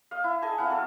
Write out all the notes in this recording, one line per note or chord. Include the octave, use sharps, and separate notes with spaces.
D#5 F5
E4
G#4 A4 D#5 G#5
C4 E4 F5 F#5
F#3 A4 F5